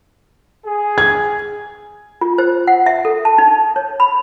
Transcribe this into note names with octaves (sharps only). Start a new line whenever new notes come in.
G#4
G#6
F4
C5
F#5
E5
A4
A5
D#4
C#5
B5